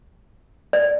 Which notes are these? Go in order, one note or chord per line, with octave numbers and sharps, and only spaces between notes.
D5